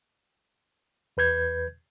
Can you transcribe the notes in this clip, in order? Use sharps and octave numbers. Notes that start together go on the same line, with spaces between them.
E2 B4 G6 G#6